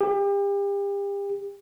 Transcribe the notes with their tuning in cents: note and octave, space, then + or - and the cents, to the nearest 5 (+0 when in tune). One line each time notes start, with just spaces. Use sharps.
G4 +35